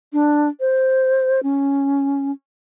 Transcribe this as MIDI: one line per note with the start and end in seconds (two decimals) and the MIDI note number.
0.13 0.49 62
0.60 1.40 72
1.43 2.31 61